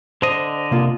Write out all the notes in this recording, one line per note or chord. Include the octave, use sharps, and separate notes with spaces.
D3 C5 D#5
C3 A#3 F4